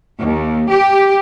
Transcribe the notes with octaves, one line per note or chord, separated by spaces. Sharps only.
D#2
G4